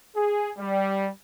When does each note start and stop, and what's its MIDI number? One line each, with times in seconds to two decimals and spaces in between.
0.15 0.49 68
0.58 1.08 55